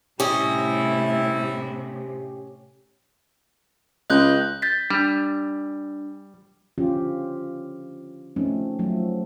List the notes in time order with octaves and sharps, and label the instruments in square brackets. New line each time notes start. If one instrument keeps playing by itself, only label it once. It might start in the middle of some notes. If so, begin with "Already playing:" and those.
[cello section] A2 C3 [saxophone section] G3 E4 [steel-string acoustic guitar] C#4 D#5 [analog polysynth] G4
[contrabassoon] C#2 [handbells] D#5 F#6 G6
[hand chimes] G6 A6 B6
[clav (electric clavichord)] G3 [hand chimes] D4
[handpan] D3 F3 C#4 F4 G4
F3 A3 C4 C#4 D#4
F3 F#3 A3